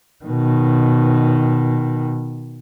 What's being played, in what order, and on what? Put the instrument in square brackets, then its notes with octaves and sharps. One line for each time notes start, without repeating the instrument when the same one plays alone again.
[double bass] B2 D#3